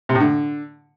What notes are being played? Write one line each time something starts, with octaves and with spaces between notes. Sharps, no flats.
C3
A2
D3